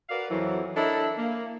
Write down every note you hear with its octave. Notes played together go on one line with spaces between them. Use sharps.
F#4 A#4 B4 D5 F5
F2 E3 F#3
D4 E4 A4 A#4 C#5 D#5
A#3